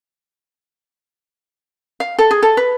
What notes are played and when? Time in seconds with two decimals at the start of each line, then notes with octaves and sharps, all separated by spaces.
2.00 F5
2.19 A4
2.31 G#4
2.43 A4
2.57 B4